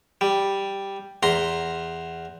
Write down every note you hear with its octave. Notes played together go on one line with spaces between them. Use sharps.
G3
E2 A#5 C6